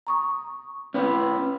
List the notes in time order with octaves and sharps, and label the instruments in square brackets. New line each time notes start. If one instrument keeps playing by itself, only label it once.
[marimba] A#5 C#6 D#6
[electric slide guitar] C#4 B4